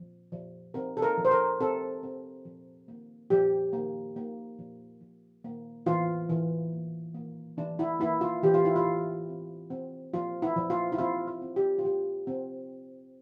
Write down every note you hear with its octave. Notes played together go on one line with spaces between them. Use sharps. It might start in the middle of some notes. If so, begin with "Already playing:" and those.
Already playing: F3
F3
C4 A#4
A4
A#4
F3
C5
A#4
C4 A4
C4
F3
A#3
F3 G4
A#3
A#3
F3
F3
A#3
E3 F4
E3
A#3
A#3
E3 D4
E4
A#3 E4
F4
E3 G4
F4
E4
F4
E3
C4
C4
F3 F4
E4
F3
F4
E4
C4 F4
F4
C4
G4
F4
F3 G4
C4